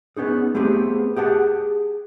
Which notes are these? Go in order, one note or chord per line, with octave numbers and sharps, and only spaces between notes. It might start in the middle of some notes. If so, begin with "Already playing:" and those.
B3 C#4 D#4 G#4
A3 B3 C4 G4 G#4
G4 G#4 F#5 G5 A5